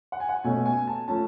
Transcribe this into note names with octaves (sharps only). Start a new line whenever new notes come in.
F#5
G#5
F#5
B2 A3 C#4 G#5
G#5
A5
F3 A3 C#4 A5